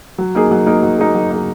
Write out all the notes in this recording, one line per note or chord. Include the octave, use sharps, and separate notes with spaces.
F#3
A#3 D#4 G#4
F#3
A#3 D#4 G#4
F#3
A#3 D#4 G#4
F#3
A#3 D#4 G#4